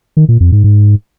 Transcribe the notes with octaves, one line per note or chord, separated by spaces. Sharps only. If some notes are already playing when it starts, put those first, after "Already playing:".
D#3
A#2
F2
G#2
G#2